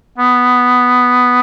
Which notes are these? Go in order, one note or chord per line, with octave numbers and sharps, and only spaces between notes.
B3